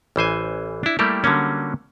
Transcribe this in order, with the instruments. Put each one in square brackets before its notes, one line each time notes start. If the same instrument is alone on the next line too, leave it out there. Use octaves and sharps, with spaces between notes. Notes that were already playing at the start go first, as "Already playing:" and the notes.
[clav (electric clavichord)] A1 E3 C5 G#5
D4 E4
G3 A3 A#3 E4 G4
D3 F#3 G3 A#3 C#4